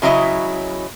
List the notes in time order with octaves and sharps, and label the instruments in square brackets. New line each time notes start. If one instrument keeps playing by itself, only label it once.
[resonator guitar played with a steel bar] C#3 F#3 E4 D#5